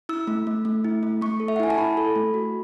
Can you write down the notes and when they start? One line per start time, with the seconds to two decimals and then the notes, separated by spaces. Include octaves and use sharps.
0.09 E4 E6
0.27 A3
0.47 A3
0.65 A3
0.85 E4
1.03 A3
1.21 A3 C#6
1.40 A4
1.48 E5
1.56 F#5
1.60 E4 G#5
1.70 A5
1.78 E4 B5
1.97 A4
2.16 A3
2.34 F#4